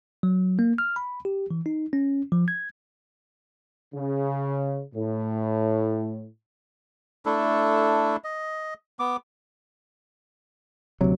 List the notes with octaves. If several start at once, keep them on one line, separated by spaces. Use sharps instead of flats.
F#3
A#3
F6
B5
G4
E3
D#4
C#4
F3
G#6
C#3
A2
A3 D4 E4 A4
D#5
B3 D6
D2 C3 F#3